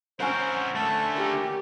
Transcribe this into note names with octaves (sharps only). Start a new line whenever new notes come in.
C4 C#4 A#4 C5 F#5
D3 A3 A5
G4 A#4